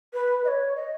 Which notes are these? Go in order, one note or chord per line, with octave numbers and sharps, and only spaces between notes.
B4
D#5
C#5
D#5